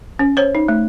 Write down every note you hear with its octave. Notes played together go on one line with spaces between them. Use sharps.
C#4
C5 C#5
D#4
A3